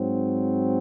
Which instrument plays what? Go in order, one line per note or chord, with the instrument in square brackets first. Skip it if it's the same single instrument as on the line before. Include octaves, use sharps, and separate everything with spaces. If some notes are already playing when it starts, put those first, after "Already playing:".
Already playing: [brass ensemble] G#2 F#3 C4